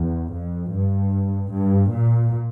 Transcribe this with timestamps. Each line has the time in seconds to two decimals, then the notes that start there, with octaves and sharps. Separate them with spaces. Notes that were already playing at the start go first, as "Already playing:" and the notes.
Already playing: E2
0.33 F2
0.73 G2
1.53 G2
1.93 A#2